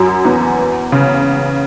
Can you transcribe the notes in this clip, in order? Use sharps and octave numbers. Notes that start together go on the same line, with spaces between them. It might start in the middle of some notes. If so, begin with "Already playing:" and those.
Already playing: F#2 F#3
E2 E3
C#3